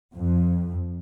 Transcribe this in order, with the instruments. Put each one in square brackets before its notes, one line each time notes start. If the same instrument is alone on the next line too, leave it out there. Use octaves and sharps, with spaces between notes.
[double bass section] F2